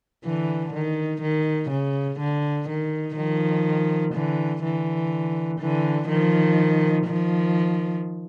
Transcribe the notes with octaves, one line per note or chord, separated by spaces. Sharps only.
D3 E3
D#3
D#3
C#3
D3
D#3
D#3 F3
D3 E3
D3 E3
D3 E3
D#3 F3
D#3 F3